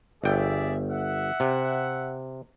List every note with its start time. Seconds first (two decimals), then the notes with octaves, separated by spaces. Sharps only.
0.24 G1 G#4 D5 E5 G5
0.88 E5 F#5
1.40 C3